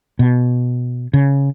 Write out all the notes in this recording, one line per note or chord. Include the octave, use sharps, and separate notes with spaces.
B2
C#3